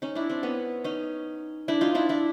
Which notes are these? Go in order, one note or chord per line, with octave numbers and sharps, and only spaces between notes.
C#4 D#4
D4 E4
C4 D4
B3 C#4
C#4 D#4
D4 E4
D#4 F4
D4 E4
D4 E4